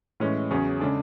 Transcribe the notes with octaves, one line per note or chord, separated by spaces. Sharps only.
A2 E3 G#3 C#4
E2 C#3 F#3 C#4 G#4
C#3 G#3 D4 A4